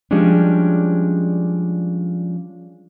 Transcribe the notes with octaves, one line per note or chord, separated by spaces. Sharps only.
F3 G3 G#3 C#4 D4